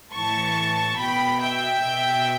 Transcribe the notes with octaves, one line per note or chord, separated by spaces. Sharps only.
A2 E3 A5 C#6
B2 G5 B5
E5 G5
B2